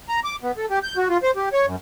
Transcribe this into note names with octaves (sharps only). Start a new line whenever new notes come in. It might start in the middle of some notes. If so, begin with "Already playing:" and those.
A#5
D6
B3
A4
G4
G6
F#4
F4
C5
G4
C#5
F#2